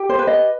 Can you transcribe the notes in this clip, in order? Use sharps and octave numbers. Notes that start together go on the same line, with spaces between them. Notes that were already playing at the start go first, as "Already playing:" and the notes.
Already playing: G4
C5
B4
D#5